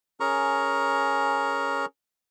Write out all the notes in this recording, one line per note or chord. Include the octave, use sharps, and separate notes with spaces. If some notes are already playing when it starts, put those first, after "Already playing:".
C#4 G#4 A#4 A#5 C#6